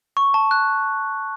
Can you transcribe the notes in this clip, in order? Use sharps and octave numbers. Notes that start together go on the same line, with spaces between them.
C#6
A5
F#6